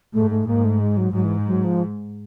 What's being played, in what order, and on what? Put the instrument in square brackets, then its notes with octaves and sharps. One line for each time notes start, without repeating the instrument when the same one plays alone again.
[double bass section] G#2 [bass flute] A3
[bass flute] A3
[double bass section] G#2 [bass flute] A#3
[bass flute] A3
G#3
F#3
[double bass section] G#2 [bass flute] F#3
[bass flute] E3
F#3
F3